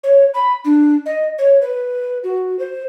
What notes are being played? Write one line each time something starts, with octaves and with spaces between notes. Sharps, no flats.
C#5
B5
D4
D#5
C#5
B4
F#4
C5